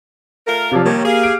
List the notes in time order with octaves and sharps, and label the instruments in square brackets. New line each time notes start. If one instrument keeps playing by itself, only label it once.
[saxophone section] A3 F4 A#4
[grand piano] C3 F3 [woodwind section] C#5 D5 F5
[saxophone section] D#3 G3 [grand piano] A#3 [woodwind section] C#5
[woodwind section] G4 F5 [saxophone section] G#4
[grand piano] D7